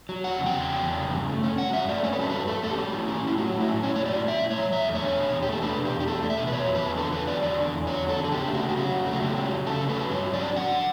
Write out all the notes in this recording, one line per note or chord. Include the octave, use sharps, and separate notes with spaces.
F#3
E2 F#5
C#3
G5
E2
F#3
E2
C#3
G2
A3
C#4
F#3 F#5
G2 E5
A3 D5
C#4 C#5
B4
F#3 A4
G2 B4
A3 A4
C#4 A4
G4
F#3
A2
C#4
A2 E4
F#3 F#4
A2
E4
C#4
A2 C#5
F#3 C#5
D5
A2
C#4 E5
A2
C#5
F#3
E2 E5
A3
C#5
D4
B2
E2
G4
A3 A4
D4 B4
B2
G4
E2
G4
A3 A4
D4
E5
B2
B4
E2 C#5
F#3
B4
E2
D3 A4
E2 B4
F#3 D5
E2 D5
D3
E2
F#3 C#5
E2
A4
D3
A4
C#3 G4
A3
F#4
C#3
G4
F#3 F#4
C#3
A3
F#4
C#3 G4
F#3
C#3
A3 A4
C#3
B4
F#3
G2 C#5
F#3
D5
C#4
D3 F#5